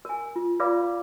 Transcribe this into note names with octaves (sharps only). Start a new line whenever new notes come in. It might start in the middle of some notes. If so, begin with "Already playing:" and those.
A#4 G#5
F4
F4 B4 D5 F5 B5 D6